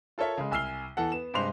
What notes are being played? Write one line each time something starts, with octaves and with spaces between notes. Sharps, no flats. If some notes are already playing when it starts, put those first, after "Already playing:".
F4 A4 A#4 C#5 E5
C#3 G#3
C2 G#5 E6 F6 C7 G7
E2 E3 A4 F#5
B3 E7
G2 C3 G#3 C5 C6 F7